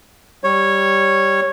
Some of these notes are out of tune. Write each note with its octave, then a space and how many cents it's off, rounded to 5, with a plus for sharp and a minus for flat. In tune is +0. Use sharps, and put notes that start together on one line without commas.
G3 +0 C#5 -10